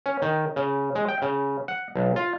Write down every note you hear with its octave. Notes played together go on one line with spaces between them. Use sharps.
C#4
D#3
C#3
G#3
G5
C#3
F#5
B1
F4